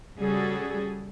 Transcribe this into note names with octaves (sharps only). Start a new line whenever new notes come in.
C#3 G3 F#4 G#4 A4